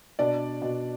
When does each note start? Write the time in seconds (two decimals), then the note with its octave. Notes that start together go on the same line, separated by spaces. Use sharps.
0.19 B2 D4 D5
0.62 B2